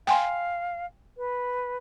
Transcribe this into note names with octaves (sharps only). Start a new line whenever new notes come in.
F5 G5 G#5 C6
B4